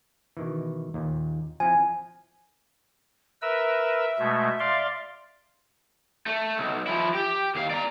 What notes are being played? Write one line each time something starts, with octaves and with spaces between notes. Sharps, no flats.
B2 D#3 E3
D#2 A#2
F3 C4 E4 G#5
A#4 B4 E5 E6
B2 G#3 A3
D5 F5 C6
A3
B1
F3 E4
G4
D#2 F5
D5 A#5